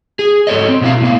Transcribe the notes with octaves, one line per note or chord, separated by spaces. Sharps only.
G#4
G#2 A4 C#5 D#5
C4
B2 B3 E4 F5
A2 B3 F5